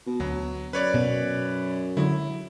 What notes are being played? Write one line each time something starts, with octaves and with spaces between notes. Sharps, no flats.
B2
D2 F#3 B3
F#2 B4 C#5 D5
B2
D3 F#3 G#3 E4